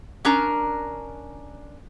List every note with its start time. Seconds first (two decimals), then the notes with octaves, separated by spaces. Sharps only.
0.25 C#4 D4 A#4 A#5